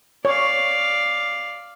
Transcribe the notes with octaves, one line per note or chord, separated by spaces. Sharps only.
C#5 D5 F5